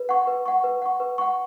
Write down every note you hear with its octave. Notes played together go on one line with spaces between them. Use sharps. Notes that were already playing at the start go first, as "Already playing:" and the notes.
Already playing: B4
F#5 C#6
B4
F#5 C#6
B4
F#5 C#6
B4
F#5 C#6